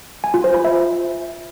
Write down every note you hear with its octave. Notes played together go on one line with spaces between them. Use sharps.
G#5
F4
C5
B5
E5